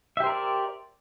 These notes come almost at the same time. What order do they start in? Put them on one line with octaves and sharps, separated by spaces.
E5 G4 C5 A#4 D5